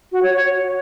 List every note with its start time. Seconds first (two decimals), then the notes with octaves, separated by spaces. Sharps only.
0.12 F#4
0.23 C#5
0.33 C#5